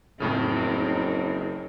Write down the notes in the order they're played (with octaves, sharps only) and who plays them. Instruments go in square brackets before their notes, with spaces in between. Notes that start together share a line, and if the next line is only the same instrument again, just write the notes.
[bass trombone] F#1 [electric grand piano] F2 A2 C#3 [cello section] C4 D#4 A#4